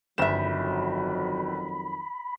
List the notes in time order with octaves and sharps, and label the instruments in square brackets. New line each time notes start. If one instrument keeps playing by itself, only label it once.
[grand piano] G1 E7 [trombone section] F2 D#3 F#3 [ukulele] C5 E5 [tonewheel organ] B5